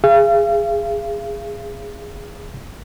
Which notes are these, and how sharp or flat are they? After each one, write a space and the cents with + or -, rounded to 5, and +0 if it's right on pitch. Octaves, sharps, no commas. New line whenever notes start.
G#4 -10 F5 -40